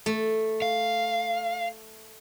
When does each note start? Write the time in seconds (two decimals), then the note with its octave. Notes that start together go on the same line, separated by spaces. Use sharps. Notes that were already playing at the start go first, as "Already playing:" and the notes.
0.06 A3
0.62 F5